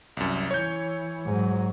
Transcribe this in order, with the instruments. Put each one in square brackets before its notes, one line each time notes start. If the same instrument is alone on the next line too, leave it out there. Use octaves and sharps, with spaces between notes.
[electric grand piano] C2 F#2
[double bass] E3 [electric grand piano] C#5 G6
[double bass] G#2 F#3